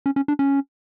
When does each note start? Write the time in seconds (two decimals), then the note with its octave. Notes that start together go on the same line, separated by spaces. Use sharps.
0.06 C#4
0.16 C#4
0.28 D4
0.39 C#4